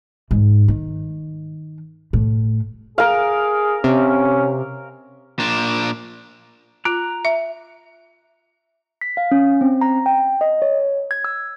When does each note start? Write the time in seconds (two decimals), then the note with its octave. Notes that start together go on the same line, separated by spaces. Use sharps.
0.31 G#2
0.68 D#3
2.13 A2
2.98 G#4 A#4 F5
3.84 C3 C#4
5.39 A#2 D4
6.85 F4 A#5 F#6
7.25 E5
9.01 B6
9.17 F5
9.32 C#4
9.61 C4
9.81 A#5
10.06 G5
10.41 D#5
10.62 C#5
11.11 G#6
11.24 E6